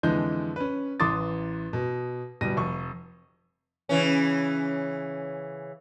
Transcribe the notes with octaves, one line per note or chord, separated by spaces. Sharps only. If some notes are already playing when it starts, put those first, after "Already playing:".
F2 D3 E3 G#3 G6
C#4 B4
A1 E3 C6 D6 D#6 A6
B2
D1 B2 G3 A#6 D#7
F1 C#6
C#3 E3 C#4